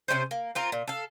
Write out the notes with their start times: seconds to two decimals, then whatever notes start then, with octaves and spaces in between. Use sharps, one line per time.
0.08 C3 G3 C#4 C5
0.31 A#3
0.55 C4 F4 A#4
0.72 A#2
0.87 A4 F5